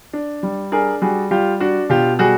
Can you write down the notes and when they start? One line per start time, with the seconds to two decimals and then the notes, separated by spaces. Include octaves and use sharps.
0.13 D4
0.43 G3
0.72 D4 G#4 A#4
1.02 G3 F#4 G#4
1.31 G3 F4 G4
1.60 D4 F#4
1.90 B2 F4 G4
2.19 G3 F#4 G#4